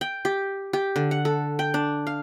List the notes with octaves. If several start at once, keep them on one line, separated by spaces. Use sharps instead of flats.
G5
G4
G4
D3
F#5
A4
G5
D4
F5